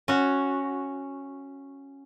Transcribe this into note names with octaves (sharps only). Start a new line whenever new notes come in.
C#4 F#4